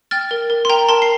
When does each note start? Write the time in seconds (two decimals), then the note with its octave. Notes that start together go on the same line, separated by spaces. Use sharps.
0.11 G5 F6 A6
0.31 A#4
0.50 A#4
0.65 C6
0.70 A#4 G5 A#5
0.88 A#4 A5 C6
1.02 C7